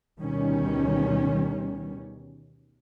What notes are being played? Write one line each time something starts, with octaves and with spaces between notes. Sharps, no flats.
D2 B2 D#3 G3 C#4